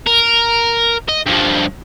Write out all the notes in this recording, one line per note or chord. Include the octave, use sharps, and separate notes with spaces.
A#4
D#5
G2 F3